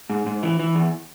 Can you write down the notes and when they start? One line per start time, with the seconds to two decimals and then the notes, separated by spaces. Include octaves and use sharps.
0.10 G#2
0.26 G#2
0.43 E3
0.59 E3
0.75 E2